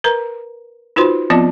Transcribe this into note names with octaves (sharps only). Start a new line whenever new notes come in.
A#4 B4 A#5
D#4 F4 F#4 B4 C5 C6
F3 B3 C4 F4 D5 D#5